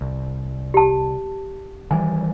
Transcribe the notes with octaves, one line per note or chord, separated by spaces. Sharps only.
C2
G4 A5
D#3 E3 G3 G#5